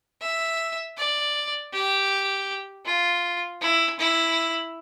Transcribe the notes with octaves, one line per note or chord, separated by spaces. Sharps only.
E5
D5
G4
F4
E4
E4